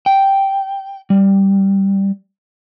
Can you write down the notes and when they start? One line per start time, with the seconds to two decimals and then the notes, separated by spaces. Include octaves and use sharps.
0.06 G5
1.10 G3